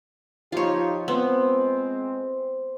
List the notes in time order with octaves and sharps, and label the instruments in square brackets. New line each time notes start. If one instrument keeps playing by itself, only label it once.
[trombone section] F3 D#4 G4 [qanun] F4 C#5
[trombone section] G#3 C4 [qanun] B3 [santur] C5